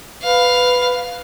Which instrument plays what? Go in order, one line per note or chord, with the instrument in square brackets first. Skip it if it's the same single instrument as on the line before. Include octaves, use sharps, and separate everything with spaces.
[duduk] B4 [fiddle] F5